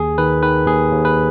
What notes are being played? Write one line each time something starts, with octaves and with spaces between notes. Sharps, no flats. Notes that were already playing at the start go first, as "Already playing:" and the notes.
Already playing: D#2 G#4
D#3 B4
D#3 B4
D#2 G#4
D#2
B4